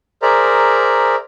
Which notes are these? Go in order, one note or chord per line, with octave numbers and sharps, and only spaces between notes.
G#4 A#4 C5 D5 E5 A#5